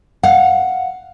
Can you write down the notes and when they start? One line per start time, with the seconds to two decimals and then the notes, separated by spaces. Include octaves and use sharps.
0.23 F5 F#5